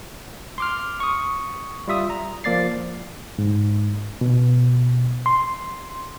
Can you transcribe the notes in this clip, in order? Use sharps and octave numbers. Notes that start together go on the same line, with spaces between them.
C6 D6 F6
C#6 D#6
G3 F4 E5 D#6
A#5
F3 A#3 D5 A6 C7
G#2
B2
C6